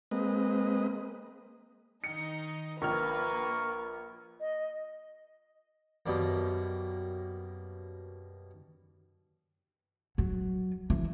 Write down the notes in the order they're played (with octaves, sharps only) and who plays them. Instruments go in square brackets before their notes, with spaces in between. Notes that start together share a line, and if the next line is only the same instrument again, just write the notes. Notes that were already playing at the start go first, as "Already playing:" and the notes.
[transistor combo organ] G#3 A#3 C4 B4 D#5
[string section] D#3 D#4 [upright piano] C#7
[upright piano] A#1 F6 [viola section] A#3 [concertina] A#4 C#6 [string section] B4
[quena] D#5
[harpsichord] F#2 B2 G3 A#3
[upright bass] F#3
E3